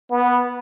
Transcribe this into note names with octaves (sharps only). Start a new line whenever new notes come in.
B3